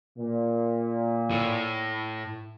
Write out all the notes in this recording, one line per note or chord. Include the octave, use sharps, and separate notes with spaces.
A#2
A2